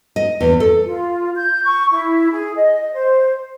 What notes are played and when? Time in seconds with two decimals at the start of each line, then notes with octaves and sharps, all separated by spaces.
0.16 D#5
0.41 E2
0.60 A4
0.86 F4
1.35 G6
1.65 C#6
1.91 E4
2.32 G#4
2.55 D#5
2.93 C5